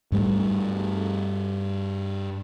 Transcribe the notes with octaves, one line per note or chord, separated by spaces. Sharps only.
G2 G3 A3